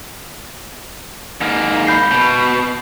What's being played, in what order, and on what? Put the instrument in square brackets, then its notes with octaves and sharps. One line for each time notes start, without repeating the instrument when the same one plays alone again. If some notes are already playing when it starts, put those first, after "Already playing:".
[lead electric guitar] G#2 A#3
[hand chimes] B5 G6 C7
[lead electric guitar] B2